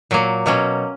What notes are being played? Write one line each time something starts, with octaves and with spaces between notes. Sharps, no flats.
A#2 F#3 A#3
B2 F#3 A#3 C#4